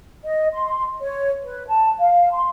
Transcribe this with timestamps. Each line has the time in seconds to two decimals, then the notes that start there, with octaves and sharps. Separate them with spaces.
0.24 D#5
0.54 C6
1.01 C#5
1.42 B4
1.68 A5
1.99 F5
2.32 C6